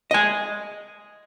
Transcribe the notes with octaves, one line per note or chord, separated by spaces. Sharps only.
D#5 G#5